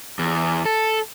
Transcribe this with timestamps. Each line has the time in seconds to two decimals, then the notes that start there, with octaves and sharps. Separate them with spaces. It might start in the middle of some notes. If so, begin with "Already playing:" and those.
0.19 E2
0.66 A4